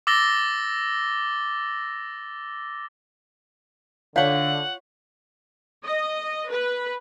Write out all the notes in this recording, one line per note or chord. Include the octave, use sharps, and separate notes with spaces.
D6 E6 A6 A#6 G7
D3 F4 C#5 F5 F#5 G6 B6
D#5
B4